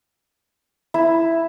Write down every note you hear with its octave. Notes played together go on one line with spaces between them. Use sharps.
E4